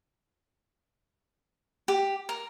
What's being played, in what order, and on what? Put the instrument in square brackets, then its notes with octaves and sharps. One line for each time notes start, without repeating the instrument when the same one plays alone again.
[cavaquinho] G4
A#4